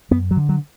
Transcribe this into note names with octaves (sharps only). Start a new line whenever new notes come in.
F#2 B3
F#3
D3
F#3